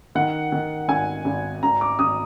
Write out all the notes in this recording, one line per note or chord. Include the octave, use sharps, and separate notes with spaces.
D#3 F#5
D#3
G#1 G#5
G#1
G#1 A#5
D6
G#1 D#6